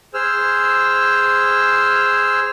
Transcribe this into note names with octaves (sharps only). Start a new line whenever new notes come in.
G#4 C5 E6 F6